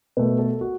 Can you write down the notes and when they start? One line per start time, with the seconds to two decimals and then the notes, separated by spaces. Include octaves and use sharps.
0.17 B2 A3 B4
0.39 A4
0.61 F#4